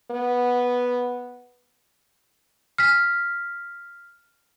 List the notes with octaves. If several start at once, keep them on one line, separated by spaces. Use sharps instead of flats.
B3
F6 B6